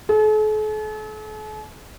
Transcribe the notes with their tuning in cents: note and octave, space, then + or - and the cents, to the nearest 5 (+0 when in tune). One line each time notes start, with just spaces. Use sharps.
A4 -45